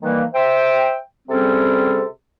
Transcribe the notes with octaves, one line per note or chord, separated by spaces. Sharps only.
D#3 E3 G3 A#3
C5 E5 G5
C3 G3 C4 C#4 G#4 A4